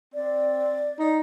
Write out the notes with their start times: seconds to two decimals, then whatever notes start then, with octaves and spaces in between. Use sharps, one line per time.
0.14 C4 D5
0.99 D#4